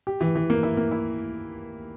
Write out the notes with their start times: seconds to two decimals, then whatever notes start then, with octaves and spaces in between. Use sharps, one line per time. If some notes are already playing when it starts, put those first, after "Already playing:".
0.07 G4
0.21 E3
0.36 E3
0.50 A#3
0.63 E4
0.77 A#3
0.91 E4